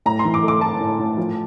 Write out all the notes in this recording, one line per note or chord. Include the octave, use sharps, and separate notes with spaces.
A2 A#5
C6
E3
D6
A3
D6
A3 A5
A2
A2
F3